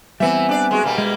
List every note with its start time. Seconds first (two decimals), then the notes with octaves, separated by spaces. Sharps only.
0.20 E3 G3 B3 C4 E5 G#5
0.49 D4 D5
0.71 G#3 F#4
0.83 B2 G3 A#3
0.98 G#3